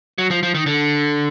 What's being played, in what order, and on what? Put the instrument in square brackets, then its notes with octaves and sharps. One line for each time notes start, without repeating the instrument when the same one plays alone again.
[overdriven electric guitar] F#3
F3
F3
D#3
D3